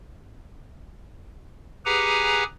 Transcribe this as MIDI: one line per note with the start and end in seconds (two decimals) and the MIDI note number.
1.85 2.44 67
1.85 2.44 68
1.85 2.44 71
1.85 2.44 78
1.85 2.44 80
1.85 2.44 82